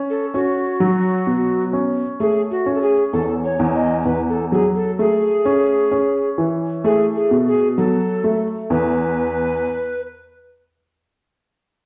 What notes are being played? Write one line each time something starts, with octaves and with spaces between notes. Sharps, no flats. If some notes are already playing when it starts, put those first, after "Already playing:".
Already playing: C#4
A4
C#4 F#4
F#3
B2
C#4
A3 G#4
F#4
C#4
A4
G#4
E2 A4
C#5
E2
D#5
E2 B4
A4
F#3 G#4
A4
A3 G#4
C#4
C#4
E3
A3 G#4
G#4
B2
G#4
F#3 A4
A3
E2 B4